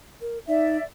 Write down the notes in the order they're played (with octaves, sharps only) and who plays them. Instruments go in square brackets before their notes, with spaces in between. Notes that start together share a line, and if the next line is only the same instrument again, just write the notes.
[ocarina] A#4
[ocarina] D#4 [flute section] D5 E5